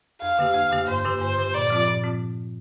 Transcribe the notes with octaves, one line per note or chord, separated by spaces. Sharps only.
F2 F5
D3 A#3 G4
F2
D3 A#3 G4
G2 C5
D3 A#3 G4
G2 C5
D3 A#3 G4
A#2 D5
F3 C4 F4
A#2
F3 C4 F4